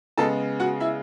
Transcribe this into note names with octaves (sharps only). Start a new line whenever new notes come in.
C#3 G#3 B3 A4 A5
F#4 F#5
E4 E5